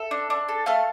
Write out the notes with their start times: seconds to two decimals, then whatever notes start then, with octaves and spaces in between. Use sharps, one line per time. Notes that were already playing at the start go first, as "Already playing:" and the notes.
Already playing: A4 E5
0.11 D4
0.30 D4
0.48 A4
0.66 A3 F5 A5